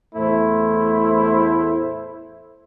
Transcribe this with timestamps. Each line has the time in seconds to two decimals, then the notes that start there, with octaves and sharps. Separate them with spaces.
0.15 E2 A2 A3 E4 C5